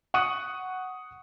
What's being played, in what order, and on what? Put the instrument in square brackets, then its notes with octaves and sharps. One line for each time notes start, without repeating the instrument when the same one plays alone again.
[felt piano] F#5 C#6 D#6 F#6 C#7 D#7